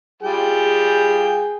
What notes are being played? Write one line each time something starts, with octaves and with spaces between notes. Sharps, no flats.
G3 F4 G#4 G5